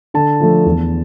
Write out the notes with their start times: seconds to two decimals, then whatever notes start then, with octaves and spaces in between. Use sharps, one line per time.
0.14 D3 A5
0.40 F3 A3
0.66 E2